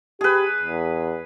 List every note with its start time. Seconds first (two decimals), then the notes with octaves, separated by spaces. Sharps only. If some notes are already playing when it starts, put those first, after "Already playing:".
0.21 G4 G#4 B4
0.62 E2